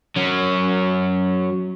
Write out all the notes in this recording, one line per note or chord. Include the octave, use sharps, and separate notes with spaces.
F#3 C#4